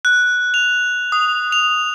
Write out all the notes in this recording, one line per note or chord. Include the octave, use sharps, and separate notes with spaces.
F#6
F7
D#6
F7